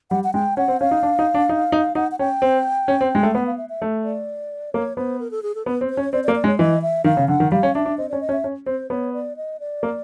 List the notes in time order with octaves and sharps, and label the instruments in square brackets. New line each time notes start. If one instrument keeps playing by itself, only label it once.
[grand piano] G3 [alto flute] F#5
[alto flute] F#5
[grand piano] G#3 [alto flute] G5
[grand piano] C#4 [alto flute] F#5
[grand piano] C4
[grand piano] C#4 [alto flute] F5
[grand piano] D#4
D4
D#4
D4
D#4
D#4
[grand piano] D#4 [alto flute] F#5
[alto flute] F#5
[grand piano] C#4 [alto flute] G5
[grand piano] C4
C#4
C4
G#3
A3
[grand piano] B3 [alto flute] F#5
[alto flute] F5
E5
E5
[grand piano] A3
[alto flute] D5
[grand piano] A#3 [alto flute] C#5
[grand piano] B3 [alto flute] C5
[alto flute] A#4
A4
G#4
A4
[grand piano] B3 [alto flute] B4
[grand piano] C4
[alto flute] C5
[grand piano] C#4
[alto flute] C#5
[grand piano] C4 [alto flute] D5
[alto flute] D5
[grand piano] A#3
[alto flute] D5
[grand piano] G#3
[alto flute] C#5
[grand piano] E3 [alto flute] D#5
[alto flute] E5
[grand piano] D#3 [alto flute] F5
[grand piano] C#3
[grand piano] D3 [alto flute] F#5
[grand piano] D#3
[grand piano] G3 [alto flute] F5
[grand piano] C#4
[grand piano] D4 [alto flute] E5
[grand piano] D4
[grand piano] C4 [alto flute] D#5
[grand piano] C#4 [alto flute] D5
[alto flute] D#5
[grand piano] C#4
[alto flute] E5
[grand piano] C#4
[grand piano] C4 [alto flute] C5
[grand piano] B3 [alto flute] C#5
[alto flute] D5
D#5
D5
[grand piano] A#3